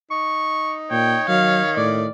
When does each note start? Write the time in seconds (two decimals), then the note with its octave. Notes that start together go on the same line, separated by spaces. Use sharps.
0.11 D#4 C#6
0.91 A#2 C#5 G5
1.28 D#3 F#3 F5
1.77 A2 D5